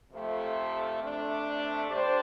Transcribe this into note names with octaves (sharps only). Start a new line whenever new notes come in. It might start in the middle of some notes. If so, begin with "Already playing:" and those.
F2 C3 A3
C3 A3 D4
G3 D4 G4 C5